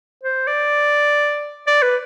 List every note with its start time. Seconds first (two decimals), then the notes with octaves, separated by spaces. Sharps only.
0.24 C5
0.47 D5
1.67 D5
1.83 B4